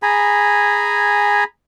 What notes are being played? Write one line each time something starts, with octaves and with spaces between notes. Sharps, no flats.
G#4 G#5 A#5 B5